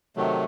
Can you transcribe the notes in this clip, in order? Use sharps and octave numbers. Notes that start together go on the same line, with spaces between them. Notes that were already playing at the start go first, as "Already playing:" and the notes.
C3 D#3 F#3 A3